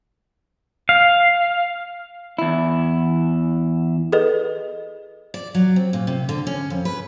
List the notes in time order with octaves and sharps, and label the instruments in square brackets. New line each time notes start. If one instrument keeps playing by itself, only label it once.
[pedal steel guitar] F5
[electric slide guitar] E2 E4
[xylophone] G#4 A4 B4 D#5
[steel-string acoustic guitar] D5
F#3
C4
A#2
C3
D3
C#4
F2
B4